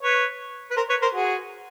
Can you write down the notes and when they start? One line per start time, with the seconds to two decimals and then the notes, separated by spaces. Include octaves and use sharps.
0.03 B4 C#5
0.71 B4
0.77 A#4 C5
0.90 B4 C#5
1.02 A#4 C5
1.14 F#4 G#4